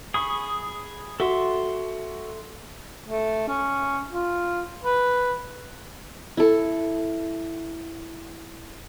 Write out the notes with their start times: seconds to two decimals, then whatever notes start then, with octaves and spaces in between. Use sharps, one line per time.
0.14 G#4 B5 C#6 D#6
1.20 F#4 A4 E5 C6
3.09 A3
3.48 C#4
4.12 F4
4.84 B4
6.37 E4 A4